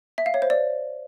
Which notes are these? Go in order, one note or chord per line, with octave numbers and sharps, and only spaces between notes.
E5
F5
C#5
C5
D5